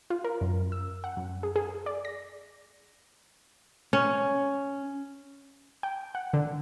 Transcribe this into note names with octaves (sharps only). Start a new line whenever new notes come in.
F4
A#4
F#2
E6
F#5
F#2
G#4
G#4
D5
A#6
C#4
G5
F#5
D3